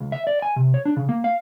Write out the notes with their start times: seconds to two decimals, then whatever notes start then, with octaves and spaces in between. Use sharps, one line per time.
0.01 C#2
0.12 E5
0.27 D5
0.42 G#5
0.56 C3
0.74 C#5
0.85 D4
0.97 C#3
1.09 A#3
1.24 F5